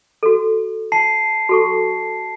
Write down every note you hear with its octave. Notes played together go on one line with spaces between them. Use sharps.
F#4 A4
A5 C7
F#4 A4 C#6